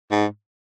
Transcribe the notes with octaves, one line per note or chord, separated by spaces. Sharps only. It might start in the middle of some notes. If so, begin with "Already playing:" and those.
G#2